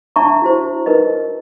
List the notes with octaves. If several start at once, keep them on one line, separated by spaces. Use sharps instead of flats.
D4 E5 A5 A#5 C#6
E4 F#4 C5
D#4 A#4 B4 D#5